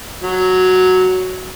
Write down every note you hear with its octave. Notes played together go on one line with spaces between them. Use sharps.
F#3